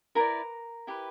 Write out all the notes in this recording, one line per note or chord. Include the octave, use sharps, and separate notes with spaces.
E4 A#4 B4 D5 A#5
E4 G4 B4